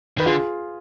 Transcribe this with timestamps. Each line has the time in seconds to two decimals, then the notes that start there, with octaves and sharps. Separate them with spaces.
0.18 D#3 B4
0.26 D3 F4 G#4